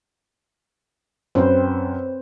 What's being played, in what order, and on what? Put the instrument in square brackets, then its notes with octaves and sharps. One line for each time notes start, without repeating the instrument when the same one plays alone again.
[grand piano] F#2 [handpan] C4 B4 C5